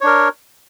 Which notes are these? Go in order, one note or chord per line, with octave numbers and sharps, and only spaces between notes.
D4 A#4 C#5